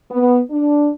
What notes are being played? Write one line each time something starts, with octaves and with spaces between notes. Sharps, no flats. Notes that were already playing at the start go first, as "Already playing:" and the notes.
B3
D4